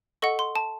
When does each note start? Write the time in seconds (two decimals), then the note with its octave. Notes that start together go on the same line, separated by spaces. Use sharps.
0.22 A4 D#5 F#5 C#6
0.39 C6
0.56 A5